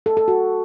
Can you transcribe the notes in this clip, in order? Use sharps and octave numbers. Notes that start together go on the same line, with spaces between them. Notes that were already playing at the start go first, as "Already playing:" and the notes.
A4
A4
F#4